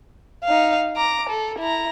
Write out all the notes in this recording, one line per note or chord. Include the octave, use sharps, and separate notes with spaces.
D#4 F5
A#5 D6
A4
E4 A#5